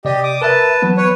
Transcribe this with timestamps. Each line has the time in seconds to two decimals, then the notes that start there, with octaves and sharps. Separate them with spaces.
0.05 C3 G4 D5 D#5
0.23 D6 D#6
0.42 A#4 B4 E5 A5
0.82 E3 F#3 B3
0.97 B4 C#5